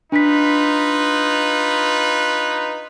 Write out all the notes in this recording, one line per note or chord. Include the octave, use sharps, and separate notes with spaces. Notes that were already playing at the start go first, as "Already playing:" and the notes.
D4 D#4 F4 B4 B6